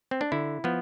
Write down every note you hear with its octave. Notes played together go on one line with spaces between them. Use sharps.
C4
D4
D3 E4
F3 B3